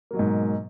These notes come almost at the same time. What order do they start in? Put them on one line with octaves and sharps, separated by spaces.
A#3 F#3 B2 G#2